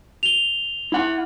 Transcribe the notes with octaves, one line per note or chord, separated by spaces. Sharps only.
F7 G7
E4 F#5